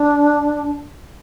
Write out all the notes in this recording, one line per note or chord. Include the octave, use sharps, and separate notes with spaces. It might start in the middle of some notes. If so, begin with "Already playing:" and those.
Already playing: D4